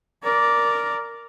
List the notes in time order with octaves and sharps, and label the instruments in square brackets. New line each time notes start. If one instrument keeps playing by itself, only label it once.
[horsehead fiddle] A#4 D5